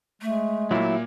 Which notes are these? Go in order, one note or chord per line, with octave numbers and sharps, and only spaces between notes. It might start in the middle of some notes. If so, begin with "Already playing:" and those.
G#3 A3
A#2 F#3 A#3 E4